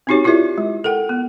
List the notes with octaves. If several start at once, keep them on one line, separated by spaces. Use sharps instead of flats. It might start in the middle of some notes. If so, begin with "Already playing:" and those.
C4 C#4 D#4 F#4 G4 C#5
E4 F4 G4 A#4 D5 E5
G#3
A4 A#4 F#5 G5
B3